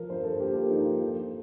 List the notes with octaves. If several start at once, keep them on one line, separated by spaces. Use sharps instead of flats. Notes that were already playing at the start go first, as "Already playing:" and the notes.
Already playing: F3 A#4
G2 C5
A4
A#3 G4
F4
F3 D#4
F4
F3 A4